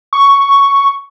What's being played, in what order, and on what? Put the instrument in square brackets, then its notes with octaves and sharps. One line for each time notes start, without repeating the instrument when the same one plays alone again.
[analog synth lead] C#6